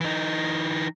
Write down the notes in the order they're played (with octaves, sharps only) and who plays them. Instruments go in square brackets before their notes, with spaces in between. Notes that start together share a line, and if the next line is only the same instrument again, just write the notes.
[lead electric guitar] E3 D#4